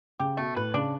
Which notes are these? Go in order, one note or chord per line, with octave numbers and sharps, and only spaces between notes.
C#3 G4
B2 A3
A2 B4
C#3 D4